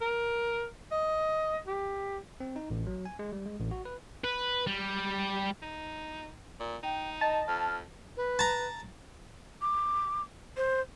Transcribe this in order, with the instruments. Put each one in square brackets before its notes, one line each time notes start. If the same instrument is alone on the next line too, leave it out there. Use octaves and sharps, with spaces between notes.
[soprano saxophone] A#4
D#5
G4
[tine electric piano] C4
D#4
A1
F#3
G#5
G#3
G3
G#3
A1
F#4
B4
[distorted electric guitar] B4
G3
[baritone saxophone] D#4
A#2
[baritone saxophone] D#4 [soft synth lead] G5
[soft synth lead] D#5 [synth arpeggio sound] A5
[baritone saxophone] F2 [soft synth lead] F6
[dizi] B4
[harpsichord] A5 A#5
[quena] D6
C5